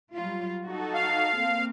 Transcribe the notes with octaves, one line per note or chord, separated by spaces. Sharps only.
F#3 G3 F4
D#4 F#4 A4
F5
A#3 C4